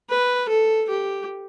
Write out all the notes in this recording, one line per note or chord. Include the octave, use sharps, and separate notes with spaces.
B4
A4
G4